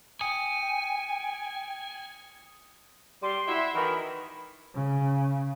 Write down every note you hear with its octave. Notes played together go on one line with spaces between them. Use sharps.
G5 G#5 D#6 C#7
G3 C6
E4 F#4 E5
D#3 E3 B5
C#3